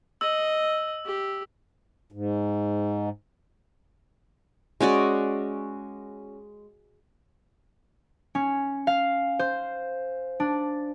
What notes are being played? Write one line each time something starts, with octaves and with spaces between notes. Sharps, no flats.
D#5 E6
G4
G#2
G#3 C#4 F#4 D5
C#4
F5
C5
D4